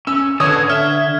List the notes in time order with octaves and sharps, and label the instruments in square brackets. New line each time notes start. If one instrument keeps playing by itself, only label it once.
[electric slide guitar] C#4 [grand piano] E6
[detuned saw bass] D3 [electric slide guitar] B4 A5 [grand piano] C#5 D#6 [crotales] G#6
[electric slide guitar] E5 [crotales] F6